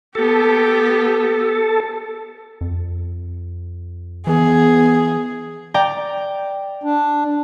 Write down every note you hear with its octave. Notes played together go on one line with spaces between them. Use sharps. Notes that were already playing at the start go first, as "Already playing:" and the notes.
B3 G4 A4
F2
E3 B3 G#4
D5 G5 A#5
D4